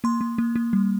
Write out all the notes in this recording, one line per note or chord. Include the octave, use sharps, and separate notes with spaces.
A#3 C6
A#3
A#3
A#3
G3